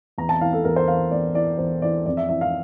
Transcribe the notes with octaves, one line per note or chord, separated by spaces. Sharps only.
E2 A#5
A5
E3 F5
A4
E2 A#4
C5
E3 F5
E2 D5
E3 D5
E2 C5
E3 D5
F2 D5
E5
E3 E5
F5